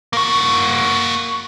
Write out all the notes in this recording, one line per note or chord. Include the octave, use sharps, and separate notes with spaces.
A#3 F#4